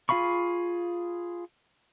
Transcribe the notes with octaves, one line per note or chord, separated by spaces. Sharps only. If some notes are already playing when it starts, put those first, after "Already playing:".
F4 G#4 F5 B5 C#6